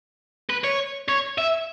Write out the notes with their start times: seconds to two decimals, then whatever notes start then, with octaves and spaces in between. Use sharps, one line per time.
0.50 B4
0.64 C#5
1.09 C#5
1.38 E5